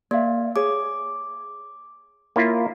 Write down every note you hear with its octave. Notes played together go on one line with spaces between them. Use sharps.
A#3 D5 E5 F5
G#4 C#5 D6
A#3 E4 F4 C#5